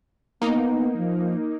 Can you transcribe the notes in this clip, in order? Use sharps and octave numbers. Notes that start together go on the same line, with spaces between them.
A#3 B3 D#4
F3